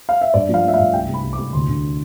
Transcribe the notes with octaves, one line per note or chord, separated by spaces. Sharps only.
F5
E5
G2 D5
F3
F5
A3 E5
F5
G2
C2 G5
C2
B5
C2
D6
C2
D2 C6
D3